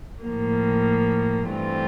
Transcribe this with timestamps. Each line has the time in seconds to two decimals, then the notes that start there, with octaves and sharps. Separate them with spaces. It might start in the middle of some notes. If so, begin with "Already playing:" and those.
0.24 A2 F3 A#3
1.49 G2 E3 A3 C4 F4